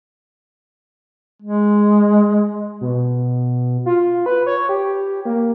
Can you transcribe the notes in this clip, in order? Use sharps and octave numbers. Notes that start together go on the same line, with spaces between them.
G#3
B2
F4
B4
C#5
G4
A#3